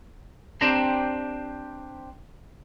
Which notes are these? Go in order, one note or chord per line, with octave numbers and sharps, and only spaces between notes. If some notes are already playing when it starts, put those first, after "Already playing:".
C4 D4 G4 C5 A#5